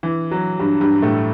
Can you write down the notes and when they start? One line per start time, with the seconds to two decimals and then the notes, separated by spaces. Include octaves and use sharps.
0.03 E3
0.31 F#3
0.59 G2 G3
0.81 G2 G3
1.02 A2 A3